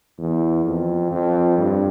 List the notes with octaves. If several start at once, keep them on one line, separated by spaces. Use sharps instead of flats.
E2
F2
F2
G2